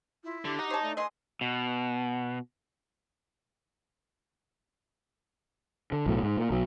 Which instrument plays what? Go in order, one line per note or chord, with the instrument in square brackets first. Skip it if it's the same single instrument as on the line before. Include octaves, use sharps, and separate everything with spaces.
[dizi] E4 [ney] F4
[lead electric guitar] D3 [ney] G4
[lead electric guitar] D#4 [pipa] F#4 [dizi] D#5
[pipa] C5 A5 [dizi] C#5
[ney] A3 [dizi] D5
[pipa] E3 G#4 D#5 [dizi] C6
[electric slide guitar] B2
[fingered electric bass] D3
B1 A2 F#3
G#2
A#2
B1 F#3